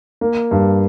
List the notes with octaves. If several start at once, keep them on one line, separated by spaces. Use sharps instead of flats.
A#3
G2